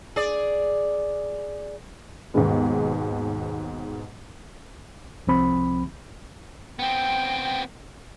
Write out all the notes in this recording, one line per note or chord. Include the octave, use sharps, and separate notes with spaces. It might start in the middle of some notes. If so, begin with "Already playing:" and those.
G#4 D5
D#2 G#2 B2 D#3 G#3 B3
C2 F3 C4 B5
B3 C4 G5